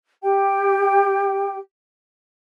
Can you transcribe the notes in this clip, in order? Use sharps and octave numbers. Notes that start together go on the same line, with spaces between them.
G4 G5